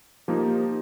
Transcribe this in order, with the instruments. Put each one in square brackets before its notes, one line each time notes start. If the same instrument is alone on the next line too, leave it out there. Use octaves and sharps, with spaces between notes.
[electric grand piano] F3 A#3 D#4 [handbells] G4